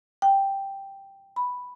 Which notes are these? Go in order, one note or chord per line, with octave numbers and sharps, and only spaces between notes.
G5
B5